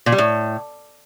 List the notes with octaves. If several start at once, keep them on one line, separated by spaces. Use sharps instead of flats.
A#2
G3
A2